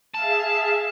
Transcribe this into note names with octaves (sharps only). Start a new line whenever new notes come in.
G#4 E5 F5 A5